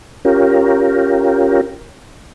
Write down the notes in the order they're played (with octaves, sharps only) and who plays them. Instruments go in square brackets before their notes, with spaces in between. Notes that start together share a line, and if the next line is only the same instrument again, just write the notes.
[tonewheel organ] C#4 F4 G4 A#4